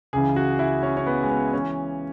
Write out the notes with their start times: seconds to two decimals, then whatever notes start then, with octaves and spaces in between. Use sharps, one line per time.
0.13 C#2 C#3 E3 G#4
0.36 F#4
0.59 E4
0.83 C#4
0.97 C#4
1.06 B3
1.23 G#3
1.30 B3
1.53 E3 C#4